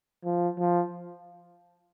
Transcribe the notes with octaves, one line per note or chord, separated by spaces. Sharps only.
F3
F3